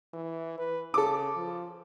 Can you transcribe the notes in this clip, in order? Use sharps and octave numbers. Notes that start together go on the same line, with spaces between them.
E3
B4
C#3 A4 D6
F3